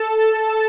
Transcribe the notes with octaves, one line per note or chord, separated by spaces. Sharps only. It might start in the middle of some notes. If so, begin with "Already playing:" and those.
Already playing: A4 A5